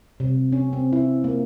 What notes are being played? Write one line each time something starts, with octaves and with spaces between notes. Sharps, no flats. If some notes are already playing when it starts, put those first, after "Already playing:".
C3
C#4
C4
E4
A#3